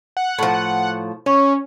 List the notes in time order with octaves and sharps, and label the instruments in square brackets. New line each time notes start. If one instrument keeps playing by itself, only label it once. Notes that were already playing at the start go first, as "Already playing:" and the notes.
[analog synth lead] F#5
[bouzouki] A2 F3
[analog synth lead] C#4 [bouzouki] C#5